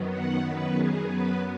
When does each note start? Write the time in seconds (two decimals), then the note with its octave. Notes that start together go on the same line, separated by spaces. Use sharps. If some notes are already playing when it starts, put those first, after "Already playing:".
Already playing: F#2 D#3 F#3 B3
0.09 F#5
0.41 B4
0.74 G#4
1.06 F#2 F#3 B3 B4